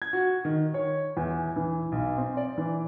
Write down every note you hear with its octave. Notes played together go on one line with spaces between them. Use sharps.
G#6
F#4
D#3
C#5
E2
E3
B1
C4
D5
E3